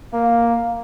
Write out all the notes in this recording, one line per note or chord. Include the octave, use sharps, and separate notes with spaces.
A#3 F5